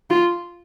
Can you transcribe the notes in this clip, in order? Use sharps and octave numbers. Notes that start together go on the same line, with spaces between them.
F4